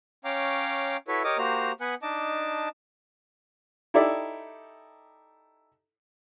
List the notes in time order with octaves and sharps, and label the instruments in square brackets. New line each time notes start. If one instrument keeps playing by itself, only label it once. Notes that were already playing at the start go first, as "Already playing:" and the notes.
[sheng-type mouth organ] C#4 C#5 F5 G5 A#5 D6
E4 F#4 A4 B4 C#5 E5
G4 A#4 C#5 D#5 D6 D#6
A#3 F#4 G4 C5 A#5
B3 B4 F#5 G#5 F#6
D4 D#4 D#5 A5 D6
[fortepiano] D#4 E4 G4 A4 D5 E5